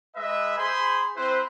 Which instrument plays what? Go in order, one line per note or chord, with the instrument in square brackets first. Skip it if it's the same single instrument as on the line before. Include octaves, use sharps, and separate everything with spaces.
[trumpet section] G#3 B4 D#5 E5
G#4 C5 G#5 B5 C6
C4 E4 B4 C5